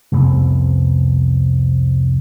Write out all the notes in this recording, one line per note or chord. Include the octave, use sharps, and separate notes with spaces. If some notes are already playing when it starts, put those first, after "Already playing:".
C2 F2 C3 B3